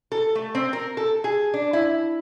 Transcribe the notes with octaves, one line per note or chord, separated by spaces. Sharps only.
A4
A3
C4
A#4
A4
G#4
D4
E4